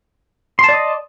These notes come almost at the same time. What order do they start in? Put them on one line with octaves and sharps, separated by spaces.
C6 A5 D5 D#5